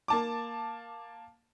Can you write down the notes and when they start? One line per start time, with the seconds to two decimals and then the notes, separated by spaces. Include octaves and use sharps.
0.08 A#3 A5 D6